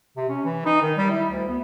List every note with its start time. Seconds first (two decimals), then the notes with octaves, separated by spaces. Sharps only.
0.17 C3
0.29 C#4
0.45 E3
0.65 D#4
0.82 D#3
0.97 G3
1.10 E4
1.31 D2
1.48 B3